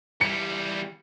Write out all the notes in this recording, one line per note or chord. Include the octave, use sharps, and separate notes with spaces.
E2 G3 C#7